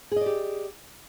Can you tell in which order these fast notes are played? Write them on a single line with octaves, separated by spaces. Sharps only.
G#4 D#5 D5 G4